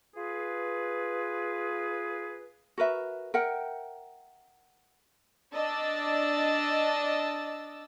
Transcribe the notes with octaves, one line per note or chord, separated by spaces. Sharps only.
F4 G#4 B4
F#4 A#4 B4 E5
A#4 E5 F#5 G5
D4 D5 D#5 E6 A6